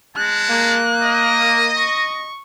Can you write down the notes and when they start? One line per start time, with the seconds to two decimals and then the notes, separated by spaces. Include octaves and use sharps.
0.16 G#3 A5 F#6
0.50 A#3
1.02 D#5
1.77 C#6